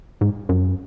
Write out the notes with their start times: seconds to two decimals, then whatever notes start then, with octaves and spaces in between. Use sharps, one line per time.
0.21 G#2
0.49 F#2